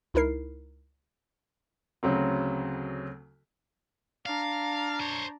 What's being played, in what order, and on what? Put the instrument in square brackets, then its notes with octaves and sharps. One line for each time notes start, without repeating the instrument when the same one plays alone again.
[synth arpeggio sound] C#2 D#4 E4 A#4 C7
[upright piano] D2 C#3 F#3 C4
[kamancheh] D4 A#5 [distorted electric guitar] F5
[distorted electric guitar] C5 C#5